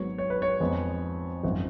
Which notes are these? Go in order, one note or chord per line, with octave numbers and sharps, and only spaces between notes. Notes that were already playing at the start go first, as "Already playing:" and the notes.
Already playing: G#1 G#2 F#3 B3 C#5
C#5
B4
C#5
F2 F3 G#3 B3
G#1 F#2 F3